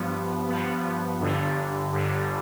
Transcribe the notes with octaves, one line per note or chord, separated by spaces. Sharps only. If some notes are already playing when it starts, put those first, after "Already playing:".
Already playing: G2 F3 B3
G2 F3 B3
G1 G2 D3
G1 G2 D3